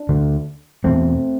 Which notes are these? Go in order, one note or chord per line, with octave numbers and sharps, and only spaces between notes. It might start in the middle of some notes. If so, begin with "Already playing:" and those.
Already playing: D4
D2 D3
E2 B2 A3 C4